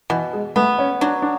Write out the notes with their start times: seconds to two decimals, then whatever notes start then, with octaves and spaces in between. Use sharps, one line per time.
0.10 B2 E3
0.33 G#3
0.56 A3 B3
0.79 C#4
1.01 F#3 D4
1.22 D4